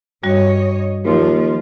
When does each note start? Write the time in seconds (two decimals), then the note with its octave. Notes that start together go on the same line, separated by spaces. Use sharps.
0.23 G2 G3 F#4 C#5 D#5
1.05 D#2 F3 A#3 F4